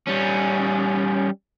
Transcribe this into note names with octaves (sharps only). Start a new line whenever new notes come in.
G3 C#4